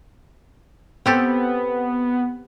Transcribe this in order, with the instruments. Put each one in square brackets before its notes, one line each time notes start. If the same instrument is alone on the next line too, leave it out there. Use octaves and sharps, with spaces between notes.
[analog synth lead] B3 [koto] C4 G4 A4